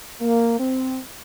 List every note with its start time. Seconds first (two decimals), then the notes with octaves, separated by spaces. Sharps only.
0.22 A#3
0.60 C4